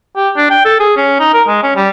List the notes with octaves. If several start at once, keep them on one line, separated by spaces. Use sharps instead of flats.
G4
D4
G5
A4
G#4
C#4
D#4
A#4
G#3
C#4
G3